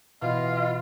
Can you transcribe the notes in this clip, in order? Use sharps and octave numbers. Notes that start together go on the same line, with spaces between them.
B2 E3 B3 F4 D#5